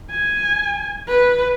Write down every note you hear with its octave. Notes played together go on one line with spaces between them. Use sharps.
G#5
B4